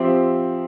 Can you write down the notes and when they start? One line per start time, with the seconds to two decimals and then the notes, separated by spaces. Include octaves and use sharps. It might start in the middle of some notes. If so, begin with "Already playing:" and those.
Already playing: F3 C4 G4 C5 E5